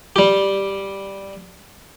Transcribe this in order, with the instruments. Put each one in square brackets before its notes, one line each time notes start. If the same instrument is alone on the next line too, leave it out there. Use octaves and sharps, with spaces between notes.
[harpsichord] G3 G4